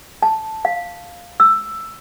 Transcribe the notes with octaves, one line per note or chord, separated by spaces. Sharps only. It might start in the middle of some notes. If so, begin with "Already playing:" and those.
A5
F5
E6